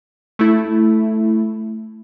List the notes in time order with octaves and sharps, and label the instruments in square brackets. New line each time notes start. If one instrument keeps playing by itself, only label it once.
[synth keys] A3 E4